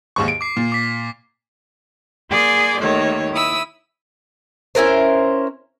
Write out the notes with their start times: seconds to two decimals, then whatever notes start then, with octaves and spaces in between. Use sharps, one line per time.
0.16 D#2 G#2 C#6
0.28 D7
0.41 D6 C7
0.56 A#2
0.72 D6 B6
2.30 A#3 G#4 D5 G#5 C6
2.81 D#2 D#3 A3 C#5
3.32 E4 D#6 E6
4.75 C#4 E4 A#4 C5